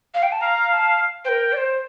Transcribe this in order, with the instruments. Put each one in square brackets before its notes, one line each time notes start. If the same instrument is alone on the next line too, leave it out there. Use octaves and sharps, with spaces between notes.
[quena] F5
G5
A5
[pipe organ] F5 [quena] A#5
[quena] A#5
A5
[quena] A#4 C5 [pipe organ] G5
[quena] D5
C5